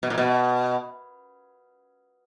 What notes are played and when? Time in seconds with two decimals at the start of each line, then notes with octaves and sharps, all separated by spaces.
0.03 B2
0.10 A#2
0.18 B2